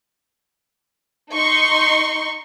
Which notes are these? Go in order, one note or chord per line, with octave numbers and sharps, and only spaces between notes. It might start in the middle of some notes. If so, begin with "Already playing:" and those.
D#4 C6 C#6